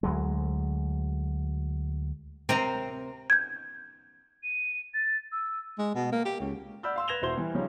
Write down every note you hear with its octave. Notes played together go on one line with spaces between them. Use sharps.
D2 F#3 G#3
C3 C4 A#4 A#5
G6 G#6
D#7
A6
E6
G#3
B2
A#3
G4
C#2
D5 F#5 B5 E6 F6 G6
F5 C6 E6
B4 G#6 A#6 E7 F7 G7
E1 E4 F#4 C5 C6 G7
E3 G3
C#3 F3 G3 C#4 D#4